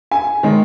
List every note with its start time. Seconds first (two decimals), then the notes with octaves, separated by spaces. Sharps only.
0.11 G#5
0.43 D#3 G#3